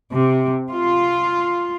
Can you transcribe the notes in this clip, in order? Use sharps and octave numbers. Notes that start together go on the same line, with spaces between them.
C3
F4